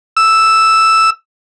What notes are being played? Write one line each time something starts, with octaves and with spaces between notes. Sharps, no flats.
E6